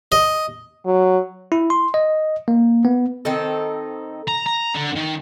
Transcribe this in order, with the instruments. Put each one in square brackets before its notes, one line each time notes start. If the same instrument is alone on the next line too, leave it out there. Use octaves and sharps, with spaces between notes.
[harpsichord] D#5
[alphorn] F#3
[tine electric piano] E4
C6
D#5
A#3
B3
[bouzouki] D#3 C4 D#4 A4
[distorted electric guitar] A#5
A#5
D3
D#3